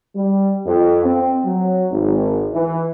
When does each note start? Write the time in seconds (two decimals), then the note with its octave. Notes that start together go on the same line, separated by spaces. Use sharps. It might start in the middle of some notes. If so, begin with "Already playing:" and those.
0.15 G3
0.65 F2
1.04 C4
1.44 F#3
1.90 G#1
2.53 E3